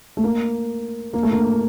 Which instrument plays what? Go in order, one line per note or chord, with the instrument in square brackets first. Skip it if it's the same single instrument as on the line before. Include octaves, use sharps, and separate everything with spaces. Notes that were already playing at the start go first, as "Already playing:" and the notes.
[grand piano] A3
A#3
A#3
A3
A#3